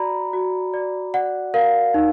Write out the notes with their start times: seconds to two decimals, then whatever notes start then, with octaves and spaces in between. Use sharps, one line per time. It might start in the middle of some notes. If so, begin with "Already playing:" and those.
Already playing: F#4 D5 A#5 B5
0.33 F#4
0.74 D5
1.14 D5 F#5
1.54 A#4 F5
1.94 D#4